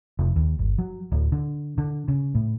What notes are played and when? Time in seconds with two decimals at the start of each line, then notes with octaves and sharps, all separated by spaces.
0.19 F1
0.36 D#2
0.59 G1
0.78 F#3
1.11 D1
1.32 D3
1.78 D3
2.08 C#3
2.35 A2